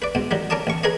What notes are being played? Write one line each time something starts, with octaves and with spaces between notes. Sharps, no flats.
B4 D5
G#2 B2
D#3 F#3 G3
C#4 A#4 D5 A5 D#6
A1 C#6
G#4 A#4 B4 C#5 D#5